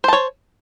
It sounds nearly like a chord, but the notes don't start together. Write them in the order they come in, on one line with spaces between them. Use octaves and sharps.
C5 A5 C#5